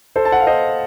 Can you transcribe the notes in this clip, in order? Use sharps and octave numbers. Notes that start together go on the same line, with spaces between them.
A4 C5
A5
F#5
F5
C5 D#5